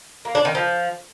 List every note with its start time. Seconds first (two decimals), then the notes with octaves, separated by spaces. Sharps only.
0.25 A#3
0.35 D4
0.45 D#3
0.55 F3